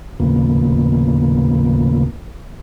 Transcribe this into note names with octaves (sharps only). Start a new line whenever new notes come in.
D#2 A2 C#3 F3 A#3 B3